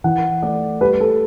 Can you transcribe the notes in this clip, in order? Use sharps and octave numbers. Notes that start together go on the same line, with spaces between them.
E3 F#5
A3 D5
G3 B4
A4